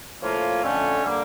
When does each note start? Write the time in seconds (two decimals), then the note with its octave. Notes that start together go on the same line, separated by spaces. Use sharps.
0.21 A2 F3 A#3 C#4 F4
0.62 F2 D3 A3 C#4
1.04 D3 G3 A#3